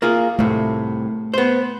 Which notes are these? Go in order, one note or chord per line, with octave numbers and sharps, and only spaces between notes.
A#3 F4 G#4
C2 A2 A3
B3 C5